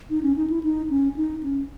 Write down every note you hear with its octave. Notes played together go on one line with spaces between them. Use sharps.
D#4
C#4
D#4
E4
D#4
C#4
D#4
C#4